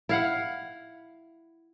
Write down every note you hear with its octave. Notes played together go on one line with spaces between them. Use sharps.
E4 F5 F#5